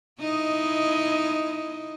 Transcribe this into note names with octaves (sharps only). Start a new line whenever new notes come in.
D#4 E4 D#5